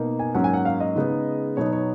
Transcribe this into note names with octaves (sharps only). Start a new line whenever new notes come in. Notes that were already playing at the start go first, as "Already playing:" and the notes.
Already playing: B2 A#3 D#4
G#5
G#2 F#3 A#3 C#4 F#5
G#5
F#5
F5
D#5
C#3 G#3 B3 D#4
B2 F#3 B3 D#4 C#5
C#5